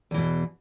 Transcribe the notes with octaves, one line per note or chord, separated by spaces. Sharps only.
E2 B2 E3